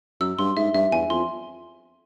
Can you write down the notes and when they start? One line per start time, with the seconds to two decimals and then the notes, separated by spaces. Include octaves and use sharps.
0.20 F#2 E6
0.38 G2 C6
0.56 G#2 E5
0.74 G2 E5
0.92 E2 G#5
1.10 F2 C6